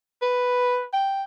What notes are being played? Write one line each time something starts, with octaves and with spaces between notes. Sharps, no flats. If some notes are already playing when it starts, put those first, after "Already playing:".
B4
G5